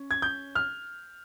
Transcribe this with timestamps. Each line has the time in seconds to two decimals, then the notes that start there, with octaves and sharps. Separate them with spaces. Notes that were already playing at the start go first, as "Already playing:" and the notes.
Already playing: C#4
0.11 G#6
0.22 G6
0.55 F6